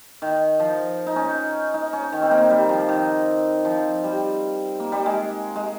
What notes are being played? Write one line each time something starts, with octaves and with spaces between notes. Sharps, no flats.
D#3
F3
D#4
C#4
D#4
D#4
C#4
D#3
C4
A#3
G3
F3
D#3
F3
G3
A#3
G3
G#3
G#3